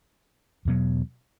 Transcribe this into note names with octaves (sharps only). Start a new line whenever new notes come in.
E2 B2 F#3